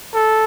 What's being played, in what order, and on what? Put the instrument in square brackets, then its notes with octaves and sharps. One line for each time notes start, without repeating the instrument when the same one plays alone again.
[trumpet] A4